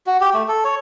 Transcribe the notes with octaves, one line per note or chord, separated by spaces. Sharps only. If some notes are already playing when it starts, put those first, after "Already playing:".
F#4
G4
A3
A4
C#5